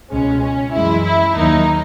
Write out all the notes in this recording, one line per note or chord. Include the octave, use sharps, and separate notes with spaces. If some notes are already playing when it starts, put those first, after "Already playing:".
C#2 B2 G#3 C#4
C#4
F#2 E3 G#3 E4
E4
D#2 D#3 F#3 A#3 D#4